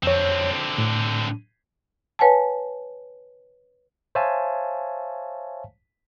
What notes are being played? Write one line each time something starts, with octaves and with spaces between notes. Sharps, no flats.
F2 D3 C4 C#5
A2
B4 C#5 F#5 G#5 A5
C5 C#5 E5 F5 G#5 A5